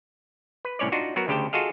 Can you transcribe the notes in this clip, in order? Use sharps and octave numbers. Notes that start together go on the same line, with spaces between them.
B4
C2 A2 C#4 C#5 D5
D4 D#4 F4 F#4
F#3 B3 F#4 A#4
D2 C#3 G4 G5 A5
F4 F#4 G#4 A4 D#5 F5